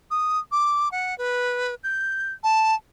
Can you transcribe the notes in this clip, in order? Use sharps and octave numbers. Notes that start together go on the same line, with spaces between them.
D#6
D6
F#5
B4
G6
A5